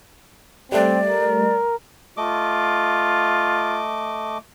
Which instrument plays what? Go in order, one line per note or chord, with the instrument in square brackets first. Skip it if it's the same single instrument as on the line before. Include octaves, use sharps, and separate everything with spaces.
[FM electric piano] G3 A3 [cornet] C4 [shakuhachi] D5
[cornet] A#4
[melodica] A3 D#5 D6 [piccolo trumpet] F4